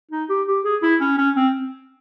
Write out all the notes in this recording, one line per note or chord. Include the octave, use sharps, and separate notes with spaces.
D#4
G4
G4
G#4
E4
C#4
C#4
C4